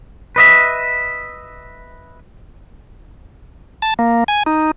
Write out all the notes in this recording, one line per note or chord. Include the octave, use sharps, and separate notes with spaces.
B4 D#5 E5
A5
A#3
G#5
D#4